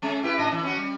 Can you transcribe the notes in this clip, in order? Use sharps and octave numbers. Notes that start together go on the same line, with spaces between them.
G#3 C#4
E4 G4 B4
A2 D4 D#5
E3
C#4 F#4
G3